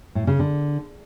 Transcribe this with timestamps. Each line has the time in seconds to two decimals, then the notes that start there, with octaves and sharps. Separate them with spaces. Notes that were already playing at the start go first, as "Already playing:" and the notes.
0.15 A2
0.27 C#3
0.39 D3